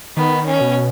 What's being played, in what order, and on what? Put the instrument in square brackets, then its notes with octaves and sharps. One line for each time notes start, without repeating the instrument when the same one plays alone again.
[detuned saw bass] D#3 [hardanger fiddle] B3
[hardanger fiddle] C#4
[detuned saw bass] B2